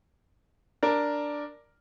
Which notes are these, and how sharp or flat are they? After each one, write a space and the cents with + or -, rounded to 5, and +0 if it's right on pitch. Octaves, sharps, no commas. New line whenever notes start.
D4 +0 A#4 +0